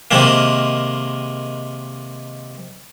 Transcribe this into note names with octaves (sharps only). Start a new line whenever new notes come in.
C3 D#3 G#3 A#3